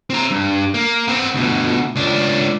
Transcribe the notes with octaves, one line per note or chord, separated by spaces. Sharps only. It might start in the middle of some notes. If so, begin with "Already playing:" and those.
C4 A#5
G2
A#3
B3 C4
D2 B2
C#2 D4